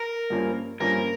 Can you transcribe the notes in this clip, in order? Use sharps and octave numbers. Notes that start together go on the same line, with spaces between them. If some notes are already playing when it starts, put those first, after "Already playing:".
Already playing: A#4
G2 F3 A#3 C#4
G2 F3 A#3 C#4 A#4